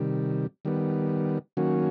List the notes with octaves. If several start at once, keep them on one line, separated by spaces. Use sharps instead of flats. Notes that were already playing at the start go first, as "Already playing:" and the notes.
Already playing: C3 D#3 G3
D#3 G3 B3
D#3 F#3 A#3 C#4 F#4